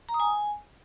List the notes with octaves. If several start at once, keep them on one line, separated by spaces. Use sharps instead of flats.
A#5
D#6
G#5